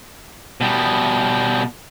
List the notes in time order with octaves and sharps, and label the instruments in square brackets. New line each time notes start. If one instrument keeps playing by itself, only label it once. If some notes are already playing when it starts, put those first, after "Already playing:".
[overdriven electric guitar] B2 G3